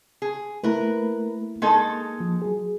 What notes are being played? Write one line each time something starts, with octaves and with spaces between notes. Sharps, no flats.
G#4
A3 A#3 E4 A#4 B4
G#3 A#3 D#4 A4
F3
F#3 G#4